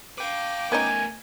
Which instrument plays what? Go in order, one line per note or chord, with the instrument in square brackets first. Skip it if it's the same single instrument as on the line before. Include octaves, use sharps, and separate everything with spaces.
[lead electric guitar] B4 F5 [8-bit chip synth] G5 D6
[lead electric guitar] A3 A#4 [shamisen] B3 C#4 D#4 [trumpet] G#5